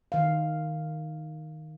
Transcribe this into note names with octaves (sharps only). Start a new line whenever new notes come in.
D#3 F5